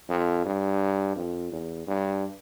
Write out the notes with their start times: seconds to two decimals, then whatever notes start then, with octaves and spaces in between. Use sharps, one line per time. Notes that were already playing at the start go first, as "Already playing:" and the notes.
0.10 F2
0.46 G2
1.16 F2
1.52 E2
1.87 G2